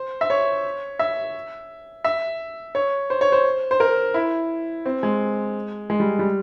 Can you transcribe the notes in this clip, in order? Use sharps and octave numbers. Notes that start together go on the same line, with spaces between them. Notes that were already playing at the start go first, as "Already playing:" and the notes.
Already playing: C5
E5
C#5
E5
E5
C#5
C5
C#5
C5
C5
A#4
E4
C4
G#3
G#3
G3
G3